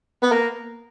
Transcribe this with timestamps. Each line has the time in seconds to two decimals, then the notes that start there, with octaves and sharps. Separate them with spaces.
0.22 B3
0.32 A#3